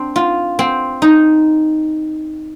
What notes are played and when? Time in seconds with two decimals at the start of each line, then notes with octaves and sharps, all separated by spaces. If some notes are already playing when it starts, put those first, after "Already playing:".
Already playing: C4 D4
0.16 F4
0.59 C4
1.02 D#4